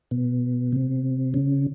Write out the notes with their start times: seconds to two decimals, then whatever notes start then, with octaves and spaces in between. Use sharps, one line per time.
0.11 B2
0.73 C3
1.34 C#3